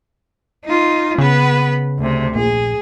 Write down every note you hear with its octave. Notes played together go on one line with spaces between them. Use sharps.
D#4 F4
C#3 B3 B4
D2 C3
A#1 G#4